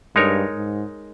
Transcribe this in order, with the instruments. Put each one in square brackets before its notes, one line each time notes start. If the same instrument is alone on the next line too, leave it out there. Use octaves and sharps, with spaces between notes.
[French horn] G2 [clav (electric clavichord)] G#3 D#4 A#4 C#5
[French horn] G#2